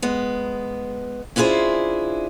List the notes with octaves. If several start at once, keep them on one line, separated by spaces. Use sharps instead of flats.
G#3 B3
C#4 D4 E4 F4 G#4 C5